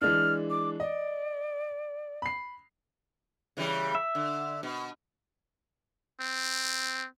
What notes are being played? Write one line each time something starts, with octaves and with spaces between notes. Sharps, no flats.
E3 G#3 D4 F6
D6
D5 D#5
B5 C7
C#3 E3 G3
E5
D3
B2
C4